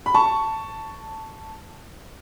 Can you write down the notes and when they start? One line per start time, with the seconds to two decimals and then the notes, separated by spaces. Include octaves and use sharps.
0.06 B5
0.15 A5 C#6